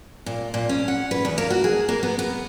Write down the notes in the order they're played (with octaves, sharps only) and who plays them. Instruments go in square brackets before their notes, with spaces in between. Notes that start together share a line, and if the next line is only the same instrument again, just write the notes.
[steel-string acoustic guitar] A#2
A#2
C#4
F#5
B4
E2
A#3
F#4
G#4
A#3
B3
B3